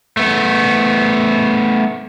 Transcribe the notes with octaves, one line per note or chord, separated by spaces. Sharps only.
A3 B3